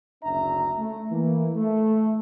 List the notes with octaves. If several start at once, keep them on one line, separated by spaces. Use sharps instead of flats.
F#1 D2 C#4 D4 E5 A#5
A3
E3 A#3
A3